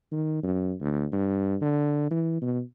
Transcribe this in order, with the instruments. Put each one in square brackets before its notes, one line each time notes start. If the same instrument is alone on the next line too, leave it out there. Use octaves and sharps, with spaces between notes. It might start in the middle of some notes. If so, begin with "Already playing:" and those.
[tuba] D#3
F#2
D2
G2
D3
E3
B2